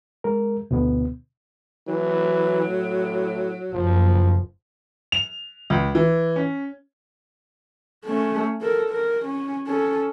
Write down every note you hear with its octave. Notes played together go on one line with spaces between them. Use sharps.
G#3 A#4
D2 B2 D3 B3
E3 F#3
A2
F#1 F3
F7
C#2
E3
C#4
A3 C#4
A4 A#4
A#4
C#4
C#4 A4